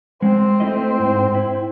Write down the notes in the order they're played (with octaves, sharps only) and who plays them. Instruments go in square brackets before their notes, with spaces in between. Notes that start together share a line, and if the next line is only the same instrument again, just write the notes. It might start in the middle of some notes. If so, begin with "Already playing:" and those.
[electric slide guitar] G#3 [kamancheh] C4
[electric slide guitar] A3 E4 D#5
G#2
E4